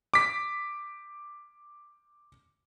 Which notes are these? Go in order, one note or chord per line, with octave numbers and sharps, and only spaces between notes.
D6 B6